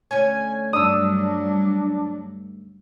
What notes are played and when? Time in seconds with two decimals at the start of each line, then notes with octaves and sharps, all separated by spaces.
0.11 D2 C#4 C#5 G#5
0.73 G2 F#3 D4 D#6 E6